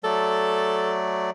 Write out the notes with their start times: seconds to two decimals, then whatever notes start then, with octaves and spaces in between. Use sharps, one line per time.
0.04 F#3 A3 A4 D5